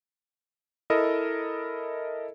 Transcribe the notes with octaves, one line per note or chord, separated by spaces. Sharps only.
E4 A4 A#4 D#5